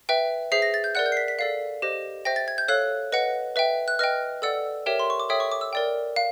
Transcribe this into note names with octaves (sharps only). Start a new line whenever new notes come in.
B4 E5 G5
G#4 C5 E5 C7
A#6
A6
G6
A#4 D5 F#5 F#6
G6
C7
B6
B6
A4 D5 F5 C7
G4 C5 D#5
C5 E5 G5 A#6
A6
G#6
G6
A4 C#5 F5 F#6
B4 D#5 F#5
B4 E5 G5
F#6
B4 D#5 G5 F6
A4 D5 F#5 E6
G4 A#4 C#5 E5 G5
C6
C#6
D6
A4 C#5 E5 G5 D#6
C#6
D6
E6
A#4 D5 G5
F5